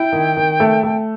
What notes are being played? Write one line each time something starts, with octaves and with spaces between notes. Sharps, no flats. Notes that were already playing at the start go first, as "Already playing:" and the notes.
Already playing: E4 G5
D#3
D#3
A3
A3